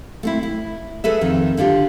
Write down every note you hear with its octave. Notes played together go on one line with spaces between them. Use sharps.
A3 C4 E4
E4
G#4 A4 B4 E5
F2 D#3
D3 D4 F4 G4